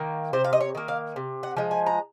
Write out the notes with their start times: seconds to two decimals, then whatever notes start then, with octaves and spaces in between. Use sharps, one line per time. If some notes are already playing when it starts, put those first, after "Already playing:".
Already playing: D#3 A#3
0.33 C3 C5
0.44 F5
0.53 D#5
0.60 C#5
0.75 D#3 A#3
0.88 F5
1.16 C3
1.43 F#5
1.57 F3 G#3
1.71 G#5
1.87 A#5